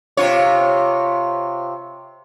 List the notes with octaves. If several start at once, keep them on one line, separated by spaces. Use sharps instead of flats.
C3 F4 C#5